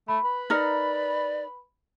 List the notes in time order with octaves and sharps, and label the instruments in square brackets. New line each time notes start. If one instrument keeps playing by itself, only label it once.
[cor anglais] A3 [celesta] B5
[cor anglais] B4
[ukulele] D#4 A#4 [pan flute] D5